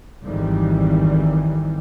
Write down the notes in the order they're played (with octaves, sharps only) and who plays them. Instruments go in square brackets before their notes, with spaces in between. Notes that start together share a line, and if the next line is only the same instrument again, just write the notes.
[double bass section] G#1 F2 D#3 E3 G3